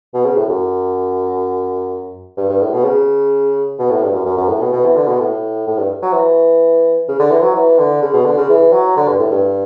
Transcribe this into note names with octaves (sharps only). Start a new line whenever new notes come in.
B2
C#3
A2
F#2
G2
G2
A2
B2
C#3
B2
A2
G2
F#2
F#2
F#2
A2
B2
B2
E3
D3
B2
A2
A2
G2
F#3
E3
C#3
D3
E3
F#3
E3
D3
C#3
B2
D3
C#3
E3
F#3
D3
G2
A2
G2